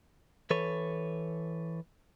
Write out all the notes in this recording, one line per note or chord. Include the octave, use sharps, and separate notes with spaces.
E3 A4 B4 C#5